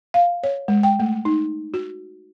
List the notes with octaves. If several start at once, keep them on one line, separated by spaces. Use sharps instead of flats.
F5
C#5
G#3
G5
A3
D#4
F#4